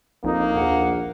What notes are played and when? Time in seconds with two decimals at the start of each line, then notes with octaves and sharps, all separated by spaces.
0.24 A#1 F2 A#3 D#4
0.56 A#1 D#2 F#5